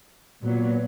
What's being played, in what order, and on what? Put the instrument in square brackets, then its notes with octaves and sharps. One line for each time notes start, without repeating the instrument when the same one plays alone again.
[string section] A#2 F#3 B3